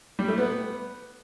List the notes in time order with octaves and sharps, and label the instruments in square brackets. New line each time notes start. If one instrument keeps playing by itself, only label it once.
[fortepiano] G3
A3
B3